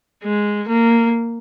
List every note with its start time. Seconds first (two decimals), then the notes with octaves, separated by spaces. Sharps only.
0.23 G#3
0.68 A#3